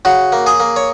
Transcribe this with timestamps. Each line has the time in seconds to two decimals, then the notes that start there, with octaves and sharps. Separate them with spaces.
0.05 C#3 F#4
0.32 A#3
0.46 G#4
0.60 A#3
0.76 C#5